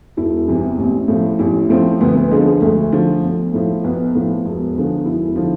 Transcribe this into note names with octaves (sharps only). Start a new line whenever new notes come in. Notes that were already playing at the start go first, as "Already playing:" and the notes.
E1 E4
E2 C3 E3
A1
A2 F3
A1 E4
A2 F3 C4
D2 B3
B3
D3 F3 G#3
G#3
D2 A3
D3 F3
B1
A2 F3
B1 B3
A2 F3
E1
E2 D3 F3
E1 E4
D3 F3